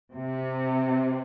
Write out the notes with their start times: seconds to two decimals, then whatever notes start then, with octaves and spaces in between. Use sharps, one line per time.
0.14 C3